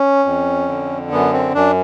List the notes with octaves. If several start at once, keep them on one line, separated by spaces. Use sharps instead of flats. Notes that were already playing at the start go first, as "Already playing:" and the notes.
Already playing: C#4
F2
D3
F#2 B3
C4
F#2 D4